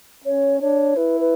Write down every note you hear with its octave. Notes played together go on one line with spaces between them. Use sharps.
C#4 C#5
D4 C#5
E4 B4
B4